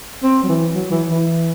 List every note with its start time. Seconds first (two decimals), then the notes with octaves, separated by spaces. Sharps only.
0.23 C4
0.43 F#3
0.49 E3
0.74 F#3
0.91 E3
1.08 E3